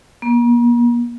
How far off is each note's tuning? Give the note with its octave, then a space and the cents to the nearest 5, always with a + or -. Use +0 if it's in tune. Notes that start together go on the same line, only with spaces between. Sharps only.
A#3 +40